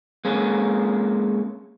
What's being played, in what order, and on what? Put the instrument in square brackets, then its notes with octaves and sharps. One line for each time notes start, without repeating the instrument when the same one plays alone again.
[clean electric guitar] G#3 A#3 C#4